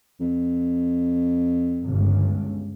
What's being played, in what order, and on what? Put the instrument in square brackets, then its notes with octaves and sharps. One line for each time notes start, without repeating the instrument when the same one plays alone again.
[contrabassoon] F2
[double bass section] G1 C#2